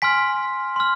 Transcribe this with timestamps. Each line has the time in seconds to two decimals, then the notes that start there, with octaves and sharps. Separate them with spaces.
0.02 G#5 C6 F6 B6
0.76 C6 F6